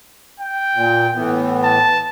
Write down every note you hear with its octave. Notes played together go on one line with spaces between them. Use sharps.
G5
A#2
A2 E3 B3
A5